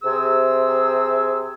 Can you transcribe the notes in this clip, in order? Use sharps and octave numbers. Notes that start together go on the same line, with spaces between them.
C3 G#4 E6